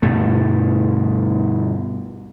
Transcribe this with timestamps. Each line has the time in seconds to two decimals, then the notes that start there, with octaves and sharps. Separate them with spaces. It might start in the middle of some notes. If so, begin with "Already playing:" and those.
0.02 D2 G2 B2 A3